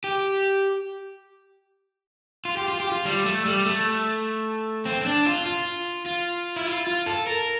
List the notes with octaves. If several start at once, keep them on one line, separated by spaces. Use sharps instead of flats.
G4
F4
G4
F4
G4
F4
G3
A3
G3
A3
C4
C4
D4
F4
F4
F4
E4
F4
F4
A4
A#4